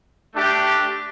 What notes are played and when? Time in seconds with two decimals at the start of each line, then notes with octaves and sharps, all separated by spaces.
0.34 A3 D4 G4